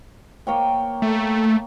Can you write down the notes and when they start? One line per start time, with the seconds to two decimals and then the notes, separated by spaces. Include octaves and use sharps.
0.47 A#3 C#5 G5
1.02 A3